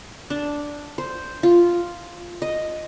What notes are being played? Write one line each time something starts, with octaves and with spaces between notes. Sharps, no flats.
D4
C5
F4
D#5